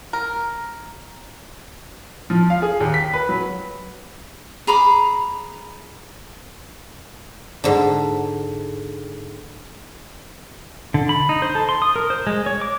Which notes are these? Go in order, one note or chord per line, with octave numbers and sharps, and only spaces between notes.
A#4
F3
F5
G#4
D#2
B6
B4
F#3
G#4 A#5 B5 D6
G#2 D3
D3
B5
D#4
C5
A4
C6
D#6
A#4
C5
G#3
C#5
D6